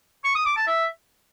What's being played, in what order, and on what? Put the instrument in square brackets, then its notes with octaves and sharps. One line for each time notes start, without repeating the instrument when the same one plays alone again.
[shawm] C#6
D#6
D6
A5
E5